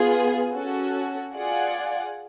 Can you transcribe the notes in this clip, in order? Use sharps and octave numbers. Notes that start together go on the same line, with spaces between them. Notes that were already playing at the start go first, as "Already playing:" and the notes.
Already playing: B3 F4 G#4
C#4 F#4 A4
F4 G#4 D5 F#5